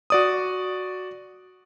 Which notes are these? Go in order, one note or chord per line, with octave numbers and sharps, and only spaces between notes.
F#4 D5 D#6